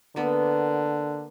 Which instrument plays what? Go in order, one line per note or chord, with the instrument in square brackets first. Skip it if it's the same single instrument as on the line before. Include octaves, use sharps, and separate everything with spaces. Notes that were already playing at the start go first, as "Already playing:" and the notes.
[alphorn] D3 [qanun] A#3 B3